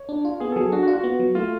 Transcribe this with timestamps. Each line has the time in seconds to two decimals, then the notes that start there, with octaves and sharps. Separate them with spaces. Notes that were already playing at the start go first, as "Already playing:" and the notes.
Already playing: C#5
0.09 D4
0.25 F4
0.40 B3 G#4
0.52 A4
0.56 F#3 G#4
0.72 D4 F#4
0.83 F#4
0.88 F4
0.93 F#4
1.03 B3
1.20 F#3
1.35 A3 F4